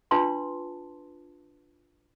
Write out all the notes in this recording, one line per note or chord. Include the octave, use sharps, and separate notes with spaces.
D4 F4 B4 A5 C6